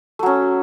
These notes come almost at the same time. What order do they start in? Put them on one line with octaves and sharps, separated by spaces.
A3 F#3 C#4